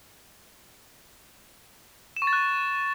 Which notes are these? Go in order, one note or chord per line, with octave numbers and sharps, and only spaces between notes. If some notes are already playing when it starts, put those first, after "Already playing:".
E7
C#6
A6
F#6